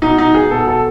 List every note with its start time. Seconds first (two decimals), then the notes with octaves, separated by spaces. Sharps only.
0.02 B2 D#4
0.18 D#4
0.35 G#4
0.50 B2 A4
0.67 A4